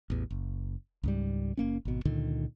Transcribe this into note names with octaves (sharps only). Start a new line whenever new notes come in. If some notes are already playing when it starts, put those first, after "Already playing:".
A1 E2
F#1
C#2 G#2 G3
F#1 A#3 C#4
G#1 B2
C#2 A#2 D3 D#3